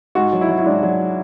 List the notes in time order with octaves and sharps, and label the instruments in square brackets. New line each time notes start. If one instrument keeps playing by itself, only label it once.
[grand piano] G#2 F#4
F#3
E4
F#3
E4
G#2 D4
F#3